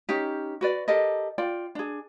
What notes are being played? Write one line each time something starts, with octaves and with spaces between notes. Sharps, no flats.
C#4 D#4 G4
F#4 B4 D5
G4 A4 A#4 D#5
F4 D5 G5
D4 G#4